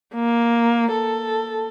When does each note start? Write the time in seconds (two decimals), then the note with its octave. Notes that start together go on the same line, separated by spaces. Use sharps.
0.15 A#3
0.93 A4